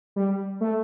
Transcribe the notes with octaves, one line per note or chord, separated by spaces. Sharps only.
G3
A3